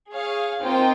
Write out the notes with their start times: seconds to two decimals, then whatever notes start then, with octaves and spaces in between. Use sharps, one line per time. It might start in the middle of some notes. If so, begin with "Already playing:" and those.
0.12 G#4 C#5 F5
0.61 A#3 C4 D#4 F4 C5 G5